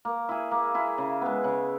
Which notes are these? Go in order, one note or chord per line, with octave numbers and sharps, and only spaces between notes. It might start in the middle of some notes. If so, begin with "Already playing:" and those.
A#3
E4 G#4
A#3
E4 G#4
C#3
G#3 B3
C#3